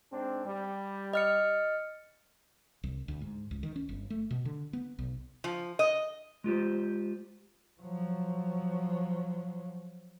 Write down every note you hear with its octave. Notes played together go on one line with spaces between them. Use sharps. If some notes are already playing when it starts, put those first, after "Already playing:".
G#2 C4 D4
G3
D#5 F6 C#7
C2
D2
G#2
C#2
D#3
C#4
G1
A3
B2
D3
B3
B1
F3
D#5
G#3 F4 G4 C5
F3 F#3